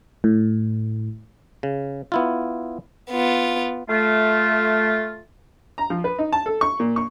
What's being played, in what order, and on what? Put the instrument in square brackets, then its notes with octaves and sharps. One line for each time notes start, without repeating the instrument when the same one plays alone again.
[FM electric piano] A2
[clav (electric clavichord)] C#3
B3 E4 F4
[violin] B3 F4
[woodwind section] A3 F4
[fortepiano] A#5
F3
B4
D#4
A5
A4
C#6
A#2
C#6